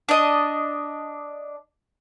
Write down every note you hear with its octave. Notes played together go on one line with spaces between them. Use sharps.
D4 D#5